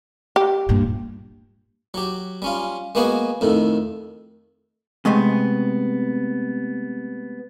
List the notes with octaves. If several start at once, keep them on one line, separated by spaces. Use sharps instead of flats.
G4
G2 A#2
F#3 G4
G3 C#4 F4
G#3 A#3 B3 F#4 G#4
F2 A2 D#3
C3 G#3 A3 B3 G#5